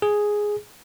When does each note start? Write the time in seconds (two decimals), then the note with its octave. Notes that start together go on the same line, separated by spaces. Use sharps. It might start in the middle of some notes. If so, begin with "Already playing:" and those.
0.02 G#4